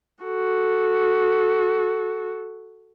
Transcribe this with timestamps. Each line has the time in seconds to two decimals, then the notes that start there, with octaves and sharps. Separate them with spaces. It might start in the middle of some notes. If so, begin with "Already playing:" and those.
0.24 F#4 A4